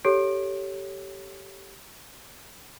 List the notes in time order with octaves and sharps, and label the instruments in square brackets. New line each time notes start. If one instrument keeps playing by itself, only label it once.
[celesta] G4 A4 C#5 D7